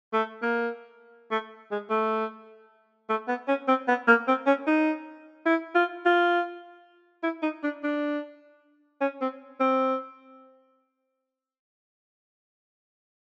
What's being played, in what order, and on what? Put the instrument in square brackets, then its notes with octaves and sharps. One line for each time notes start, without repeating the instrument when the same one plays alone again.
[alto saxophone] A3
A#3
A3
G#3
A3
A3
B3
C#4
C4
B3
A#3
C4
C#4
D#4
E4
F4
F4
E4
D#4
D4
D4
C#4
C4
C4